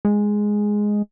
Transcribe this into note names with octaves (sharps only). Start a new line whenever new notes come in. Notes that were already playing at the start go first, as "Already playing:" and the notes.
G#3